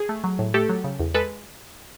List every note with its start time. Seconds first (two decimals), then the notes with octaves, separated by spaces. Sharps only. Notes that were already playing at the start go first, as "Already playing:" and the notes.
Already playing: G#4
0.09 A3
0.24 F#3
0.39 A2
0.54 A3 G4 A4
0.69 F#3
0.84 C#3
1.00 E2
1.14 G#3 A4 B4